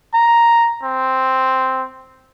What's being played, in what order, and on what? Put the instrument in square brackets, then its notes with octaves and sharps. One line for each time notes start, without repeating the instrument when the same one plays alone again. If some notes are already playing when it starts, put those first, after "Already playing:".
[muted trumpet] A#5
C4